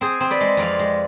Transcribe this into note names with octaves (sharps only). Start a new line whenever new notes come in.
C4 G#4 C5
C4 C5
B4 D5
G#3
F2 D5 F5
G#3